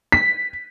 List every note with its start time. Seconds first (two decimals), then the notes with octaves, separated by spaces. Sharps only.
0.12 B6